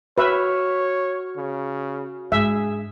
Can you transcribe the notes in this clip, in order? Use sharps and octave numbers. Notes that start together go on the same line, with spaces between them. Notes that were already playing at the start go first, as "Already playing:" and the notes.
F#4 B4 C#5 E5 F6
C#3
G#2 D4 G#4 E5